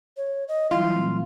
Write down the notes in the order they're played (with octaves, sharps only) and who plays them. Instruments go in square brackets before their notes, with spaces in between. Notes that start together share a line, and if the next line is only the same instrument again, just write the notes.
[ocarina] C#5
D#5
[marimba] E3 F#3 G3 [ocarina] E4 [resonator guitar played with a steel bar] F4
[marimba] A#2 A3 C4